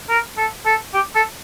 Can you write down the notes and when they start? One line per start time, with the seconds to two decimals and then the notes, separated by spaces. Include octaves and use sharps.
0.09 A#4
0.37 A4
0.66 A4
0.94 G4
1.15 A4